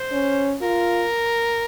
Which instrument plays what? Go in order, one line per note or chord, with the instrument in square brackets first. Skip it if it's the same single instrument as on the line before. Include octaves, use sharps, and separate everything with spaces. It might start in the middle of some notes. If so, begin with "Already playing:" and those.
Already playing: [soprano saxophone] C5
[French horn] C#4
[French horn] F4 [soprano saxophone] A#4